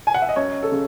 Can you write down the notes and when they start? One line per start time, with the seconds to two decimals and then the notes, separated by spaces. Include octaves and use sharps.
0.07 G#5
0.14 F#5
0.22 E5
0.29 D#5
0.36 F#2 C#5
0.63 A4
0.72 C#3